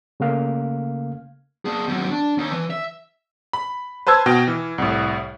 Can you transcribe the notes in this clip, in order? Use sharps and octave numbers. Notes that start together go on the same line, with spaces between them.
C#3 A3 A#3 F5 F6
A#3 G#4
D#2 F#3
D4
D#2
E3
E5
B5
B4 C5 A5 E6 G#6
B2 G5 F6
E3
C2 A2